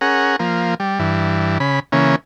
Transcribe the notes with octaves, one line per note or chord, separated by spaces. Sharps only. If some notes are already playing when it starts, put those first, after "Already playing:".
C#4 G#4 A#4 F#5
F3 A#3
G3
G2 E3
C#3 B5
C#3 E3 A#3 C#4